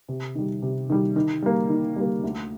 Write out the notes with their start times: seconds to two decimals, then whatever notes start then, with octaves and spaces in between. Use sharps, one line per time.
0.09 C3
0.35 D#3 G3
0.62 C3
0.89 D#3 G3
1.16 D#3
1.42 G3 A#3
1.69 D#3
1.96 G3 A#3
2.24 D2